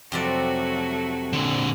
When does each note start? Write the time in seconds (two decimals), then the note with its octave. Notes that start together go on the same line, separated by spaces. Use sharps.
0.12 F2 C3 F#3 A3 F#4 D5
1.33 A#2 D3